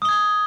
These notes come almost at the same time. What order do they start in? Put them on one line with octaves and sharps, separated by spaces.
D#6 G7 G#6